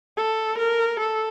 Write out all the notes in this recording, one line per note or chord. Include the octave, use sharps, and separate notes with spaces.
A4
A#4
A4